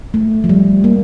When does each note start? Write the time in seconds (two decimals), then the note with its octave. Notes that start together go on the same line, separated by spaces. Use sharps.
0.14 A3
0.44 F3
0.49 G3
0.84 A#3